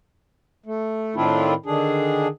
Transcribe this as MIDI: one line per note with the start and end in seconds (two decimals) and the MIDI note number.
0.66 1.15 57
1.16 1.54 45
1.16 1.54 51
1.16 1.54 60
1.16 1.54 62
1.16 1.54 64
1.16 1.54 65
1.66 2.27 50
1.66 2.27 51
1.66 2.27 62
1.66 2.27 68